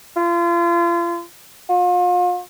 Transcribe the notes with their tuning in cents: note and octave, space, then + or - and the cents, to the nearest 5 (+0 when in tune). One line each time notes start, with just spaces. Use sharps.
F4 -35
F4 +40